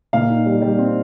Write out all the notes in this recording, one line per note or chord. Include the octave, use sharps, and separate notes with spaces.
A#2 F5
D#4
G3
G3
C4